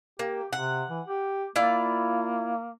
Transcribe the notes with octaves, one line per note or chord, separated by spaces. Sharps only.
A#3 G4
C3 F#5
E3
G4
A#3 E4 F4 D5